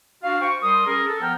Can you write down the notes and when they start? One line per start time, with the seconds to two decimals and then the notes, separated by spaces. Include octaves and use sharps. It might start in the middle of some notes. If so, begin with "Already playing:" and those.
0.23 D4 F#4 F5
0.41 C5 G5 C#6
0.63 G3 A#4 C6 D#6
0.86 C#4 G#4 A#4
1.06 A4
1.21 F3 B3 G5 A#5 F6